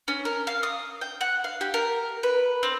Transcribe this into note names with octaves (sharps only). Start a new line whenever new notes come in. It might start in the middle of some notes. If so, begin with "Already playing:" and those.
C#4
A#4
F5
D#6
G5
F#5
F5
G4
A#4
B4
C4